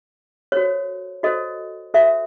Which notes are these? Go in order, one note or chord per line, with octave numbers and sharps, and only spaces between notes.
F#4 A4 C5 C#5
F#4 A4 C5 D#5
F#4 A4 C5 E5